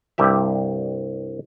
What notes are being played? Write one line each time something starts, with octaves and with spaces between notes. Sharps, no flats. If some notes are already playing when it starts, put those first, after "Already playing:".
C2 G2 G4 E5